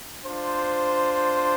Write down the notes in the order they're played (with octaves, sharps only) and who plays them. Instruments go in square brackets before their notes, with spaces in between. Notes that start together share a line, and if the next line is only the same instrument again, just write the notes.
[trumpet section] D4 F4 C5